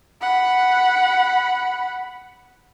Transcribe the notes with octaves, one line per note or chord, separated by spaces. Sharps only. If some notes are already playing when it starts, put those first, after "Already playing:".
F#5 B5